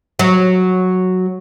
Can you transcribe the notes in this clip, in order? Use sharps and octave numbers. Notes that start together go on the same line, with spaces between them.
F#3